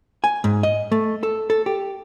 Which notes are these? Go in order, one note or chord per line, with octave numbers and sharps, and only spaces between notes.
G#5
G#2
D#5
A3
A4
A4
G4